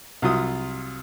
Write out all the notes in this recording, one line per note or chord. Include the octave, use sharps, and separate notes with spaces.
C2 F#3 F4 D#6